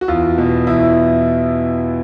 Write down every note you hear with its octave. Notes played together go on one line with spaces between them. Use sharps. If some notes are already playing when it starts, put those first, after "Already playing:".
F#4
E2 F4
B2
E2 E4